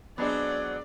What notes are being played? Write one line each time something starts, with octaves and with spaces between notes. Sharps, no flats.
F#3 G#3 B3 C4 D4 G#4 D5